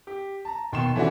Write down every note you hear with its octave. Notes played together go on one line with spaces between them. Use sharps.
G4
A5 A#5
D#2 B2 G5 C6 C#6 E7
E3 A3 C#4 D4 F#4